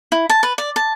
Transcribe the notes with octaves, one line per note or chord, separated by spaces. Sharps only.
E4
A5
B4
D5
A5